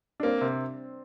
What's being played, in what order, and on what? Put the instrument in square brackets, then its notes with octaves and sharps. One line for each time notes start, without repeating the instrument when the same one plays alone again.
[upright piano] D4
[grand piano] A#3 [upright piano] C4
[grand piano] C3